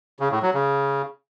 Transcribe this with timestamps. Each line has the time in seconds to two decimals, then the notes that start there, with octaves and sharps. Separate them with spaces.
0.20 C#3
0.31 A2
0.42 F#3
0.54 C#3